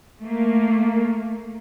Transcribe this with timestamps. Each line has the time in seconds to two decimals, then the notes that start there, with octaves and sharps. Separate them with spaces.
0.20 A3 A#3